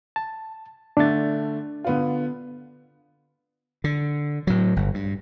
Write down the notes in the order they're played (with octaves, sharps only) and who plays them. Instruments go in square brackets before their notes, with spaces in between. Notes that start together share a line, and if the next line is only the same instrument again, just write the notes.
[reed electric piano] A5
[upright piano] D3 A3 [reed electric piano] D4 A6
[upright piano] D3 B3 F4
[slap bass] D3
A2 F#3
G1
G2